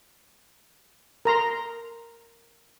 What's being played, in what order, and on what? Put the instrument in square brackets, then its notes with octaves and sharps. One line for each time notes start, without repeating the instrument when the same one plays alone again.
[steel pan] A#4 A#5 C6